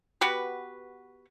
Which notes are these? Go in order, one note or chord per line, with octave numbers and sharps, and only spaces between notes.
B3 F#4 G4 B4